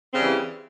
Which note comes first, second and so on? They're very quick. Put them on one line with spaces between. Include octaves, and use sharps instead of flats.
C4 C#3 G3 E3